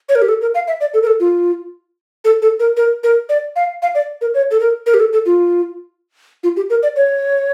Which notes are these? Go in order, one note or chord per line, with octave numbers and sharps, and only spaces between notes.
C#5
A#4
G4
A4
A#4
F5
E5
D5
A4
A#4
A4
F4
A4
A4
A#4
A#4
A#4
D5
F5
F5
D5
A#4
C#5
A4
A#4
A#4
G4
A4
A4
F4
F4
G4
A#4
D5
C#5